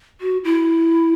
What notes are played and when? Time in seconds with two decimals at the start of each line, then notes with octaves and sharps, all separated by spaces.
0.21 F#4
0.44 E4